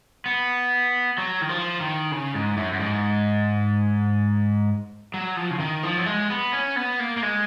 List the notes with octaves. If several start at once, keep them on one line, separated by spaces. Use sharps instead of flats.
B3
F#3
D#3
F3
D#3
C#3
G#2
F#2
F#2
G#2
F#3
F3
C#3
D#3
F3
F#3
G#3
B3
C#4
B3
A#3
A#3
G#3